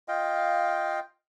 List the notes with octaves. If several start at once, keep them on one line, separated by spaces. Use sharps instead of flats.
F4 D#5 F5 G5